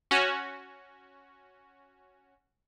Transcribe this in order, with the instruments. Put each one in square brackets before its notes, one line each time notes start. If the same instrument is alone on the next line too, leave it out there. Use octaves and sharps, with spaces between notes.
[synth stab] C#4 F#4